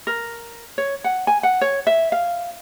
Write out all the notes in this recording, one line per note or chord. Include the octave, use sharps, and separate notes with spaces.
A#4
C#5
F#5
G#5
F#5
C#5
E5
F5